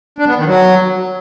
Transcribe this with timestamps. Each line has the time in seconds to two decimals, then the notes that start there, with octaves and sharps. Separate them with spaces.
0.18 D4
0.28 B3
0.37 D#3
0.47 F#3